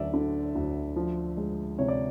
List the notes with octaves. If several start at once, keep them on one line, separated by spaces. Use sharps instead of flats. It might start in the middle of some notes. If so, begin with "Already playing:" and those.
Already playing: D2 F#3 D5 E5
D3
D2
F3
G#3
C3 C#5
D5